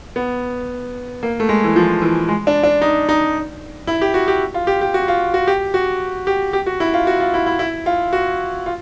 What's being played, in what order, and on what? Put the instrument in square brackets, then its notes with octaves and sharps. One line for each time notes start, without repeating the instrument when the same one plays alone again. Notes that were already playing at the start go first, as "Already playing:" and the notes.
[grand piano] B3
A#3
A3
G#3
E3
F3
E3
G#3
D4
D4
D#4
D#4
E4
G4
F#4
G4
F4
G4
G4
F#4
F4
F#4
G4
F#4
G4
G4
F#4
E4
F4
F#4
F4
E4
E4
E4
F4
F#4
F4